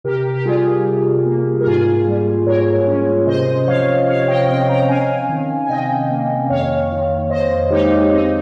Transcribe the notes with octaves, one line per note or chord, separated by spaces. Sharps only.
C3 G4 A#4
G4
G3 F4 G#4
C3
A#3
A#4
G#2 F4 G#4
G3
G#2 A#4 C#5
C#4
C3 C5 D#5
F3 C#5 F5
C3 C#5 F5
D#5 G5
C4 D#5 G5
G5 A#5
C#4 F5 G#5
D#3
G#5
C3 D#5 G5
A#3
F2 C#5 F5
D#3
F2 C5 D#5
G#3 D#4 G4
C4 D#4